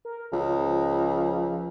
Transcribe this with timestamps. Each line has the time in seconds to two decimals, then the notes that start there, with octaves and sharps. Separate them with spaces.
0.05 A#4
0.32 C#2 F3